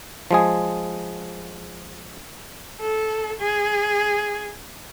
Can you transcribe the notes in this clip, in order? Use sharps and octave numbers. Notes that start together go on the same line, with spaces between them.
F3 G#3 G#4
A4
G#4